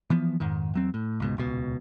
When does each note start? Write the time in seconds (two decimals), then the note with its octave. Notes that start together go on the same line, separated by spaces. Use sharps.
0.10 E3 F3 B3
0.40 F2 G#2 D#3
0.74 E2 F#3 C4
0.94 A2
1.20 C#2 G#2 B2
1.37 D#1 C#2 B2